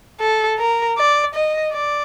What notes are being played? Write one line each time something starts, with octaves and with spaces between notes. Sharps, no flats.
A4
A#4
D5
D#5
D5